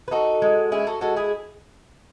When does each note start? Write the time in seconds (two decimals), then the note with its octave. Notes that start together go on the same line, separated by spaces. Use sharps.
0.08 B4
0.11 D#4 F#4 A4
0.42 G#3
0.72 C#4 E4 G#4
0.87 F#4 A4
1.01 G#3 F#4 A4
1.16 E4 G#4